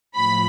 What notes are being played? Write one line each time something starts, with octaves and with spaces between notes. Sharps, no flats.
A2 F3 B5